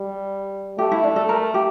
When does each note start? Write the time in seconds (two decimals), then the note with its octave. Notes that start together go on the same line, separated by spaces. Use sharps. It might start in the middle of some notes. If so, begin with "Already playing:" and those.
Already playing: G3
0.79 A3 G4
0.92 E4
1.04 D4
1.16 A4
1.29 A#4
1.54 G4